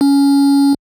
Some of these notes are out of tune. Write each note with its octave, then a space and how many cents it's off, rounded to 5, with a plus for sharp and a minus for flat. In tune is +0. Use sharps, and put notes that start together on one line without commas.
C#4 +15